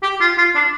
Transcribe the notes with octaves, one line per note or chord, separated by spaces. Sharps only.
G4
F4
F4
D4